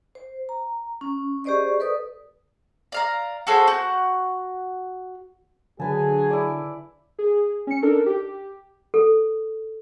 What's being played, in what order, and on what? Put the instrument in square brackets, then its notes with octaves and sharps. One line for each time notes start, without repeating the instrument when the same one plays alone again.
[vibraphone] C5
A#5
C#4
G4 G#4 C5 D5 D#5 C#6
A4 B4 D5 D#6
[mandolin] D5 F5 A#5
F#4 G#4 A4 C5
F#4 F#5 G6
[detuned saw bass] D3 [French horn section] F#3 G#4 [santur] B4 A5 [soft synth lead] G#5
[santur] E4 D5
[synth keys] G#4
C#4 C#7
D4 D#4 A4 A#4
G4
[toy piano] A4